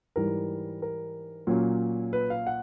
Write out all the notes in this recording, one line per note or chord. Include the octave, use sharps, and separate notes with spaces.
G#2 E3 G3 A#4
A#4
A#2 F#3 A#3 C#4
B4
F5
F#5